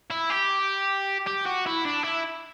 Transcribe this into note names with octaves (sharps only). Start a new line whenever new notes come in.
E4
G4
G4
F#4
E4
D4
E4